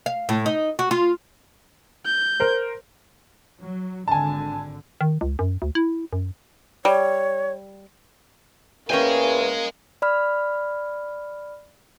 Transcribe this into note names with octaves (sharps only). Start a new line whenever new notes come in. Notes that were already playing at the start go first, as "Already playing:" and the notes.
F5
A2
D#4
F#4
F4
G6
A#4 C5
F#3
G#1 D3 G#5 A5
D#3
C#2
F#2
D2
E4
F#2
G3 C#5
E2 A#3 C#4 D#5 G5 G#5
D5 B5 F6